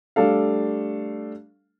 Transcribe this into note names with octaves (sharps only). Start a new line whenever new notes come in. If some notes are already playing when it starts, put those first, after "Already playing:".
G3 A3 D4 A4 F5